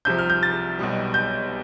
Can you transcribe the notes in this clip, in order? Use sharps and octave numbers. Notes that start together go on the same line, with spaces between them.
C2 C3 F3 G6
F6
G6
A6
B1 B2 G3
G6